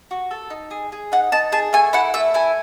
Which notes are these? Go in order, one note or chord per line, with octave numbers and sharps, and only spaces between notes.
F#4
A4
D#4
G#4
G#4
D#4 F#5
D#4 A5
G#4 A5
A3 G#5
E4 F#5
A3 E5
E4 G#5